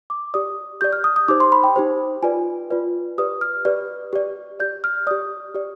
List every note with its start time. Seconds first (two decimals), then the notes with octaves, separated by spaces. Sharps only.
0.10 D6
0.34 G4 D5 D#6
0.81 G4 D5 G6
0.93 F6
1.04 D#6
1.16 D#6
1.28 D#4 G4 C5 D6
1.40 C6
1.52 B5
1.64 G5
1.76 D#4 G4 C5
2.23 F4 B4 D5 G#5
2.70 F4 B4 D5
3.18 G4 B4 D5 D#6
3.41 F6
3.65 G4 B4 D5
4.13 G4 D5
4.60 G4 D5 G6
4.84 F6
5.07 G4 D5 D#6
5.55 G4 D5